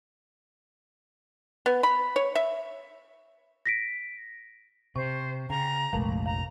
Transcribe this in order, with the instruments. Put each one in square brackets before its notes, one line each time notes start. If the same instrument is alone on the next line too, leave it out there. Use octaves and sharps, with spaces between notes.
[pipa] B3
B5
C#5
E5
[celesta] A#6 B6 D7
[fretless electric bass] C3 [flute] C5 [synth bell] C#6
[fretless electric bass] C#3 [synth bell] G5 [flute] A#5
[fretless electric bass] F1 A#1 [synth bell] G#3 A3 F5
[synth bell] F5 [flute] A#5